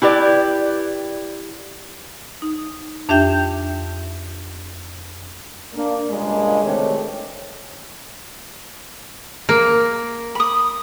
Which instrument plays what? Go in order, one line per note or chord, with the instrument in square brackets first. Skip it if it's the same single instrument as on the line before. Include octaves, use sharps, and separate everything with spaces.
[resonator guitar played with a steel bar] E4 G4 B4 D5
[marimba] D#4
F2 D4 G4 E5 G5 G6
[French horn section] A#3 D4
G2 A#2 C#3 G#3
D2 C3 D#3 A3 G4 C#5
[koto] A#3
[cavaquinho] B5 D#6